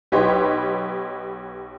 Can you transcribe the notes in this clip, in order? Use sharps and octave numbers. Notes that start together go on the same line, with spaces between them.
B1 G4 B4 C#5 D#5 C6